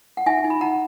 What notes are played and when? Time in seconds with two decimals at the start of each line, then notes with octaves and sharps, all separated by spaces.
0.17 F#5
0.26 D#4 E5 G#5
0.44 D#4
0.50 B5
0.61 D#4 F#5 A#5